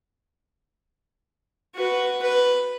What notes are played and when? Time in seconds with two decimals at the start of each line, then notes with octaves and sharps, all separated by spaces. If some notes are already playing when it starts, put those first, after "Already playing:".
1.75 F#4 B4
2.22 B4